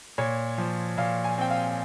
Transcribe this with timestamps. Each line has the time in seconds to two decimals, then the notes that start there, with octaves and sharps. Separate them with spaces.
0.18 A#2 C#5
0.58 F3
0.97 A#2 F5
1.24 G#5
1.38 C4 G5
1.51 F5